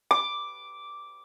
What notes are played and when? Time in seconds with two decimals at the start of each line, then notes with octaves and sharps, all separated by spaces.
0.11 D6